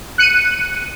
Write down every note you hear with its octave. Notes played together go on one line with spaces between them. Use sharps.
F#6 C#7 D#7